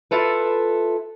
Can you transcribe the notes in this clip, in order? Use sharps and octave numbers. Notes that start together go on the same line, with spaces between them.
E4 F4 A4 B4